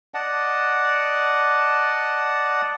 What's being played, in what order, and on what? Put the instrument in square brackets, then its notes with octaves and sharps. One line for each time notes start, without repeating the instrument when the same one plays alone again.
[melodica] D5 D#5 F#5 A5